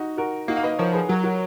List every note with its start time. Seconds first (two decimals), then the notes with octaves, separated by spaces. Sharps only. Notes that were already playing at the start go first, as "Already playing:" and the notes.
Already playing: D#4 F#4
0.17 F#4 A#4
0.48 A#3 D#4 F#4
0.57 F5
0.63 B4 D#5
0.78 F3 A#4 C#5
0.93 G#4 B4
1.09 F#3 F#4 A#4
1.24 F#4 A#4